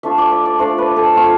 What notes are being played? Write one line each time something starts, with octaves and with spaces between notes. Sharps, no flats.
A3 D4 F4 E5
D5
E5
D5
A3 D4 F4 C5
B4
A4
A3 C4 F4